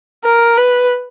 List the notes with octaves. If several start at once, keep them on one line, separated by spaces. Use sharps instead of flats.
A#4
B4